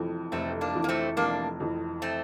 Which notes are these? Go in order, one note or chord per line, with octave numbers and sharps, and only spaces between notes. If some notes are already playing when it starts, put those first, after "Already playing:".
Already playing: F1 F2 E3
F1 A3 C4
A#3 D4
F2 E3
A#3
A3 C4
F1 A#3 D4
F2 E3
A3 C4